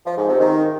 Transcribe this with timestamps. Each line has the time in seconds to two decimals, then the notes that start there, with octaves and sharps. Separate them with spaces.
0.06 F3
0.17 G#2
0.29 C3
0.40 D#3